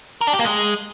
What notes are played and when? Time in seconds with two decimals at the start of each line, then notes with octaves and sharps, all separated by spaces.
0.21 A#4
0.27 D4
0.33 G4
0.39 A#3
0.45 G#3